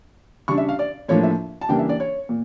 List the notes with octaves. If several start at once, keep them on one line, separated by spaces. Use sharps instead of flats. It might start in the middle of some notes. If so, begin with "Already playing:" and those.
C#3 G3 D4 C#6
E5
F5
D5
A2 F3 A#3 D4 C#5
E5
A5
C#3 E3 G3 A#3 D4 G5
E5
D5
C#5
A#2